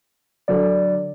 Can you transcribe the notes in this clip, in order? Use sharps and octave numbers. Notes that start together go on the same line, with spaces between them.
D3 F#3 D5